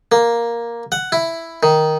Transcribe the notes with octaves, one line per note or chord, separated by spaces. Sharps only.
A#3
F#5
E4
D#3